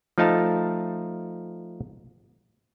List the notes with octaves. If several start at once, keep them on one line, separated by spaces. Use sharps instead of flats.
F3 A3 D#4 F5 A5